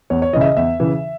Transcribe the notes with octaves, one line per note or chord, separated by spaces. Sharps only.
E2 C#5
C#5
C#3 E3 D#5 E5
D#5
E2 E5
C#3 E3